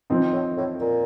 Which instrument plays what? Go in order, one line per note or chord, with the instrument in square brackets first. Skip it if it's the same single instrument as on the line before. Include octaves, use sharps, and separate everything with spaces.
[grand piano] F3 C4 D#4
[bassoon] A2
A2
A#2